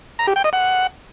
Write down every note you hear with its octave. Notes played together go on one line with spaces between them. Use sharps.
A#5
G4
G5
D#5
F#5